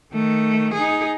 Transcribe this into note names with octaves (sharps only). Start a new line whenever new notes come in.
D#3 A3
D#4 G#4